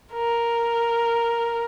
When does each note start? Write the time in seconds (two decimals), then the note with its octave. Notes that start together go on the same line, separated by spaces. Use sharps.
0.13 A#4